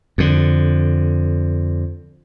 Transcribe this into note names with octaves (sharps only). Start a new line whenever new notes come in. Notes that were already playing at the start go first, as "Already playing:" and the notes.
F2 D3